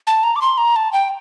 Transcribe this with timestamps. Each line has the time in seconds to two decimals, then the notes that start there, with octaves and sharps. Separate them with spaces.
0.07 A5
0.23 A#5
0.36 D6
0.41 C6
0.58 A#5
0.76 A5
0.93 G5